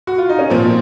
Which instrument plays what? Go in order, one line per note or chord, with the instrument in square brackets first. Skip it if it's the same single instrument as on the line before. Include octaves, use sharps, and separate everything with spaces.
[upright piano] F#4
F4
D#4
C#4
[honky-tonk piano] A#2 F3 A#3 [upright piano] C4